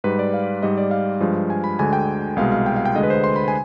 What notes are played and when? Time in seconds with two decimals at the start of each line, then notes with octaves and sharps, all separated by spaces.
0.04 G#2 G3 B4
0.19 D5
0.33 F5
0.62 G#2 G3 D#5
0.78 D5
0.91 F5
1.21 G2 F3 G#3
1.50 G#5
1.64 B5
1.79 D2 D3 G#3 G#5
1.93 G5
2.36 C2 B2 G#3 F5
2.52 F5
2.66 G5
2.76 F5
2.86 G5
2.95 D2 D3 G#3 D#5
3.03 B4
3.10 C5
3.24 C6
3.36 B5
3.48 G#5